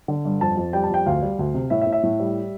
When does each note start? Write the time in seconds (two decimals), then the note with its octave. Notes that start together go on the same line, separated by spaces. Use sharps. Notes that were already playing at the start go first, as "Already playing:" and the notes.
0.08 D3
0.25 G2
0.41 F2 A5
0.57 F2
0.73 G3 G5
0.83 A5
0.90 F2 G5
1.06 D2 F5
1.22 G3
1.39 D2
1.54 C3
1.70 A2 E5
1.81 E5
1.87 A2
1.92 E5
2.03 A2
2.20 G3